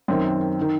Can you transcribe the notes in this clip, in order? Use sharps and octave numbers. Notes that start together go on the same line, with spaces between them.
F#2 D#3 C4
D#3